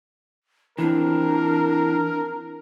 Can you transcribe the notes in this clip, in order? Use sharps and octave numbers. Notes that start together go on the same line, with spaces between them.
E3 C4 D4 A#4